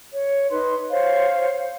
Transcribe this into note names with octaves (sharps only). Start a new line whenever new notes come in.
C#5
D#4 B4 C6
C5 C#5 F5